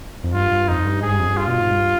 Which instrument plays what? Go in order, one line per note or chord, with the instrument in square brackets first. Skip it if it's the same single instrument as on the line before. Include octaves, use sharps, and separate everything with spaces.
[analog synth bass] F2
[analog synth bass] G2 [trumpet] F4
[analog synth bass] G2
[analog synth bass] F2 [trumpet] D#4
[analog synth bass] G2
[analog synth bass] G#2 [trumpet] G#4
[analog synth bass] G2
F2
G2
[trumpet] F4
[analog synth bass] B2
G#2
G2